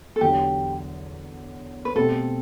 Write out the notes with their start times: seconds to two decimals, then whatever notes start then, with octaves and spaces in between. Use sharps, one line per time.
0.16 A4
0.21 E2 D3 F#3 G4
1.85 B4
1.96 B2 A3 C4 G4 A4